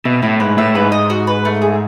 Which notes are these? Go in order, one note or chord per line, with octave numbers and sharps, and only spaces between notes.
B2 E5
A2 E4
G#2 B4
A2 E5
G#2 B4
D#5
F#4
B4
A3
G#4